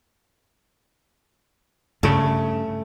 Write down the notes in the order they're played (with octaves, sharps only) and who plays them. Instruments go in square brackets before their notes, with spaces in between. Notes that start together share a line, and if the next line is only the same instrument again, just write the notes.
[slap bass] G2 C#3 [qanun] A3